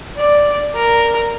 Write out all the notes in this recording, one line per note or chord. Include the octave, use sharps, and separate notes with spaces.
D5
A#4